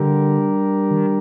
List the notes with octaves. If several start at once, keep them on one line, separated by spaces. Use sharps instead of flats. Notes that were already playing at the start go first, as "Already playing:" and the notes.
Already playing: D3 G3 D4 G4 A#4
D#3